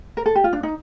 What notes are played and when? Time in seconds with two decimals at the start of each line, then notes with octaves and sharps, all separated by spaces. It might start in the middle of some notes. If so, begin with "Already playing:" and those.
0.17 A#4
0.26 A4
0.36 G4
0.44 F4
0.53 D4
0.63 D#4